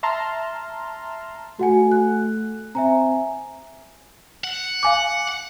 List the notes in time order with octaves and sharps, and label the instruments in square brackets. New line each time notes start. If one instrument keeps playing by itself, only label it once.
[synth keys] E5 A5 A#5 C6 F6
[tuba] A3 [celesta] F#4 F#5 G#5
[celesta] F#6
[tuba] C4 [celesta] E5 G#5 A#5
[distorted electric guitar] F#5
[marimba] F5 G#5 D6